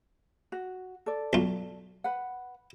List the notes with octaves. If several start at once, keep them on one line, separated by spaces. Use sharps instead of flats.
F#4
A4 D5
B1 F4
B4 F#5